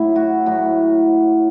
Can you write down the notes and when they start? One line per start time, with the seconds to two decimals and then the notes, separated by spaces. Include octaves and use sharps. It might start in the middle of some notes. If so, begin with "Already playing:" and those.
Already playing: A2 F#3 E4
0.16 F#4
0.46 A2 F#3 F#4